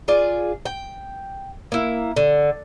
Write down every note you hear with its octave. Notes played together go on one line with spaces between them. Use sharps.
F4 G#4 D5
G5
A#3 E4
D3